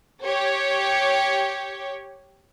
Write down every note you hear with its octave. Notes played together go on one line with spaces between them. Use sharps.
G4 C#5